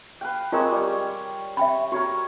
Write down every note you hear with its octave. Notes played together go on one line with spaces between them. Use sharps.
B4 F5 G5
G#3 C4 F4 A#4 C#5 A#5
G3 C#5
E5 G5 B5
F#4 A#4 C#5 C#6